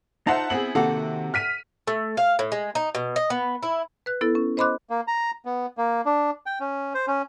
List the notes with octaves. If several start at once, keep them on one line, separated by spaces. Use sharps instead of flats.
D#4 F4 C5 E5 F#5 A5
B3 C4 E4 G#4 F#7
C3 D#3 A#3 F#4 A4 F#5
F6 B6 D#7
A3
F5
A2
G#3
D#4
B2
D#5
B3
E4
B4 F#6
B3 E4 A4
C#4
C5 D#5 B5 C6 D6 F#6
A#3
A#5
B3
A#3
D4
G5
C#4
C5
C#4